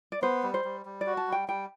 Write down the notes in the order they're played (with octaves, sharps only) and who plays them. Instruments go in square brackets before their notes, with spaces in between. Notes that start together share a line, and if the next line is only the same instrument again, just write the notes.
[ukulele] D5
[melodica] B3 [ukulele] C5
[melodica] G3
[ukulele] C5
[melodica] G3
G3
[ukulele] D5
[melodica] F#4
[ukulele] A5
[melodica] G3 [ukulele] G5
[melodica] G3 [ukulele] G5